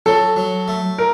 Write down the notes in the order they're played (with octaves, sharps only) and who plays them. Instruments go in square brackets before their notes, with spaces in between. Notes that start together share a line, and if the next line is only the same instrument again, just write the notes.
[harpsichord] F#3 [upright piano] A4
[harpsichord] F#3
A3
[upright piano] A#4